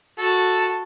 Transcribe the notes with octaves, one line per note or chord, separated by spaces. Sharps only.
F#4 A4 A5